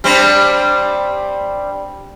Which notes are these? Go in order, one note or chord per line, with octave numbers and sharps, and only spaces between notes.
G3 C4 D4